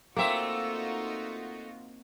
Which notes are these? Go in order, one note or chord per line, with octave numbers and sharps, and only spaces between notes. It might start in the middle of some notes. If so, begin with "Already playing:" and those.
A3 A#3 C4 D#4 F4 F#4 E5